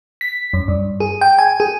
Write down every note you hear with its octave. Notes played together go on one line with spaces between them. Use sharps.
B6
F#2
G2
G#4
G5
G#5
G#4